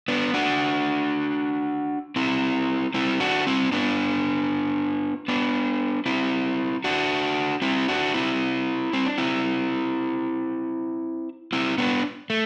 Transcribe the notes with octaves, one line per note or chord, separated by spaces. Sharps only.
B3 D4
D4 F#4
C4 E4
C4 E4
D4 F#4
C4 E4
B3 D4
B3 D4
C4 E4
D4 F#4
C4 E4
D4 F#4
C4 E4
C4
D4
C4 E4
C4 E4
B3 D4
A3